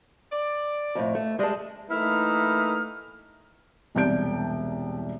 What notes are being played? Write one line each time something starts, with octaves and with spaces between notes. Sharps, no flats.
D5
F2 A2
A3
G3 G#3 A5
E3 A3 A#3 D#4 E4 F6
E1 C2 D5 A5 G6 D7